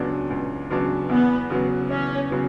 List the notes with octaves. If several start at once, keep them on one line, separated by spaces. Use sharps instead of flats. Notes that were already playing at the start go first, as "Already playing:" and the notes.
Already playing: C#2 C#3 F#3 B3 D4
C#2
C#3 F#3 B3 D4
E2 B3
C#3 F#3 B3
E2 C#4
C#3 F#3 B3